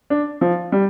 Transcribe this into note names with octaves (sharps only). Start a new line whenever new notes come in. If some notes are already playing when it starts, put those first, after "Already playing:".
D4
F3
G3